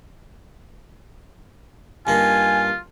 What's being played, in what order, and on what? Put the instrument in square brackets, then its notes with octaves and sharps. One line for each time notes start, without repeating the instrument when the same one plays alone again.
[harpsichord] G2 A#3 D#4 [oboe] F4 [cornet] G#5